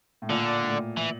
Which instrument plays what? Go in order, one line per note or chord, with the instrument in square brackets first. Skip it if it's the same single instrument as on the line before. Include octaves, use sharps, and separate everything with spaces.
[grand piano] A2
[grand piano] A#2 [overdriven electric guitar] D3
[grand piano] A2
[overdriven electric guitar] E3